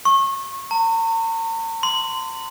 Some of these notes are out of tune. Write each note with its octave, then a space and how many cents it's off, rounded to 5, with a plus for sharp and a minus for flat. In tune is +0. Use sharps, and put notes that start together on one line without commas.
C#6 -30
A#5 -45
C6 -20